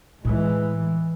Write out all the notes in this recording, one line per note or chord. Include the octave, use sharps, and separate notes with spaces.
A2 E3 G#3 A3